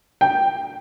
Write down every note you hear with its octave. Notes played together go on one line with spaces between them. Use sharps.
G5